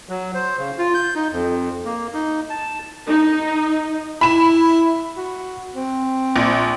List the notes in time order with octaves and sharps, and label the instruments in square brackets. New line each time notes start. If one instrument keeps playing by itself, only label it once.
[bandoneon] F#3
C5
C#3
F4
G6
D#4
F2
A#3
D#4
A5
[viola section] D#4
[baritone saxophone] E4 [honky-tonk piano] B5 E7
[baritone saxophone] F#4
C4
[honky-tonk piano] A#1